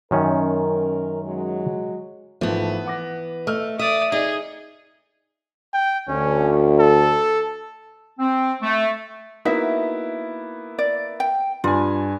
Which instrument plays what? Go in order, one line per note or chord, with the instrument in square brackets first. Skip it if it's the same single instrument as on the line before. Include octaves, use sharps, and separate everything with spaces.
[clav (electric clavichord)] F#2 D#3 C#4 [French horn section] A#4
[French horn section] F#3 G#3
[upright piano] G#1 F3 A3 [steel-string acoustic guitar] E3 B3
[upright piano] F#5 D6 A#6
[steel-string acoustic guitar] A3 [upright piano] D#5 E6 F6
[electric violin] D5 D#6 [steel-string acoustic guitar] E5
[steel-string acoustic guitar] D#4 [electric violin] G#4 [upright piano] D5
[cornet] G5
[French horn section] D2 [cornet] C#4
[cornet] A4
[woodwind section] C4
A3
[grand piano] A#3 B3 E4 [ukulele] D#4 F#4 E5
[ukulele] D5
G5
[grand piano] G2 G#5 [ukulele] F4